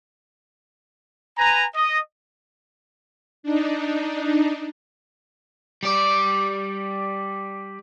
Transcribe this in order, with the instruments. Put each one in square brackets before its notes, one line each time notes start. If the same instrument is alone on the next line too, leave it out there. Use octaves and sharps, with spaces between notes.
[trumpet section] B4 G#5 A#5
D#5
[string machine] D4 D#4
[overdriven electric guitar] G3 D5